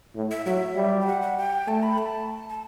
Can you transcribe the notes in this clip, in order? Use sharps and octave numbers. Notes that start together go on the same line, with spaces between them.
A2
E5
F#3 E5
G3
G5
F#5
F#5
G5
A3 A5
B5
A5
A5